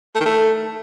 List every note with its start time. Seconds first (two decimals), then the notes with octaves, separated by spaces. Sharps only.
0.15 A3
0.20 D#3
0.25 A3